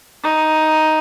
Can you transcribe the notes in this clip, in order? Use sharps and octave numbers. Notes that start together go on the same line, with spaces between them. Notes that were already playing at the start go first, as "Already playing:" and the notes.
D#4